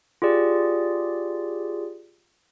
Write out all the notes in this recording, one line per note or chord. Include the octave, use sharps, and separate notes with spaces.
F4 G4 G#4 D5